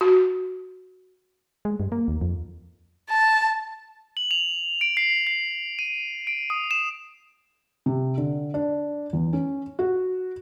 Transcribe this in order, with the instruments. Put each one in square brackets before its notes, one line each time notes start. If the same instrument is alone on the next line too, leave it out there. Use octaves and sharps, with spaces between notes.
[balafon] F#4
[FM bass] G#3
G2
A#3
D#2
F2
[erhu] A5
[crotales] F#7
F7
D7
C7
C7
D#7
D7
D#6
E7
[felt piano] C3
D3
D4
E2
C#4
F#4